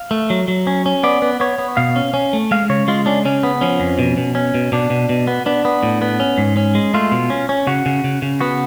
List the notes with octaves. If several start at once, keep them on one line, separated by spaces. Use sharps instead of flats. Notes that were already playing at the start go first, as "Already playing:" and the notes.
Already playing: F5
A3
F#3
F#3
C#4
C#4
B3 D5
B3
B3 C#5
B3
B2 F5
C#4
C#4
A3
G#3 F5
C#3 C#5
G#3 F4
C#4 D4
C#3 C#4
B3
F3 C#4
F2
B2
B2
C#4
B2
B2 D4
B2
B2
B3
B3 D4
B3
A2
B3
C#4
G#2
C#4
G#3
A3 F4
B2
C#4
C#4
C#3 F#4
C#3
C#3
C#3
B3 F#4